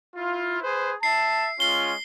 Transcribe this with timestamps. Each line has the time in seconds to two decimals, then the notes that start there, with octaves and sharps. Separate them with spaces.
0.16 E4 F4
0.62 G#4 B4 C5
1.03 E5 A5 C7
1.60 G#3 C#4 F4 C7 G7